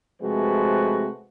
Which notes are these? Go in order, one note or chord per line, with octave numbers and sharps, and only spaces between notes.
C3 F3 G#3 A3 F#4 B4